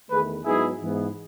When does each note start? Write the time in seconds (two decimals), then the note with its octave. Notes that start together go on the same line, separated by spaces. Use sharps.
0.10 E2 D#3 A3 G#4 B4
0.45 G#2 F#3 B3 D#4 E4 G#4
0.80 G#2 E3 B3